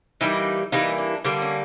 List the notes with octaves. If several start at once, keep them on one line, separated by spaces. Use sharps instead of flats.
E3 G3 A#3 D#4
E3 G3 A#3 D#4
D4
D3 G3 A#3 D4
C#4